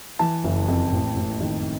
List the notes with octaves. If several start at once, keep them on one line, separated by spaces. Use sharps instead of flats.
E3 A5
F#1
F2
A1
A1
D#3